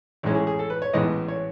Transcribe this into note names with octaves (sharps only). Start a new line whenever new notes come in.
A1 A2 G#3 C#4 E4
G#4
G#4
A4
B4
C#5
A1 A2 G#3 B3 D#5
C#5